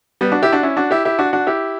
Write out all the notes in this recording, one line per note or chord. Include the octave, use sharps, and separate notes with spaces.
G3 B3
D4 F#4
E4 G4
D4 F#4
C#4 E4
D4 F#4
E4 G4
E4 G4
D4 F#4
D4 F#4
E4 G4